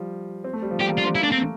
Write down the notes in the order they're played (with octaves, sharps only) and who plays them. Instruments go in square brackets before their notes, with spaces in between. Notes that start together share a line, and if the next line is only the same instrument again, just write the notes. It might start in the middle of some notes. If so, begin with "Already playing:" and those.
Already playing: [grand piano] F3 G3
C4
A3
G3
F3
[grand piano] G3 [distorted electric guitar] G4
[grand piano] A#3
[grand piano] D4 [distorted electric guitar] F4
[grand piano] C4
[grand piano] A#3 [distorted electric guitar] E4
[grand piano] A3 [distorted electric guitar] D4
[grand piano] A#3 [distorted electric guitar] C4
[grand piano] A3